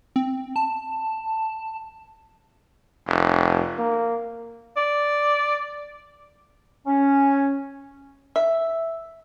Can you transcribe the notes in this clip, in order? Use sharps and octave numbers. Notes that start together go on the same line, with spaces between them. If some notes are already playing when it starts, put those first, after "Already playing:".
C4
A5
F1
A#3
D5
C#4
E5